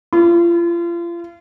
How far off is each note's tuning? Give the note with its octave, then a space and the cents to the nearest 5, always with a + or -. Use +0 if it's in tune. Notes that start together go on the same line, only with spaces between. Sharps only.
F4 -35